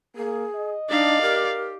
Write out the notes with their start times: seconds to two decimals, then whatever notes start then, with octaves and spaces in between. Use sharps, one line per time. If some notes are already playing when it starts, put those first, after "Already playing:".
0.16 A#3 G#4
0.56 D#5
0.90 D4 D#4 D5 F5
1.22 G4 A#4